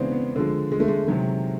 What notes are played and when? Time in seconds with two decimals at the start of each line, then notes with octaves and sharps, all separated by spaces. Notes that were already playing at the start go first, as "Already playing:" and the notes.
Already playing: C#3 E3 G#3 B3 C4 D4
0.12 B3
0.36 D3 F3 G#3
0.72 G#3
0.80 A3
0.88 G#3
1.08 C3 D#3 F#3 G#3